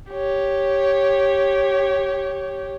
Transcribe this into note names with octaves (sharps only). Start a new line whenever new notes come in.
G4 C#5